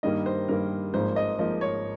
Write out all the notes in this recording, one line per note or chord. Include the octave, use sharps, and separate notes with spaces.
G2 D#3 G3 A#3 D#5
C5
G2 D#3 G3 A#3 A#4
G#1 G#2 F3 A#3 C5
D#5
G#1 G#2 F3 A#3 D#5
C#5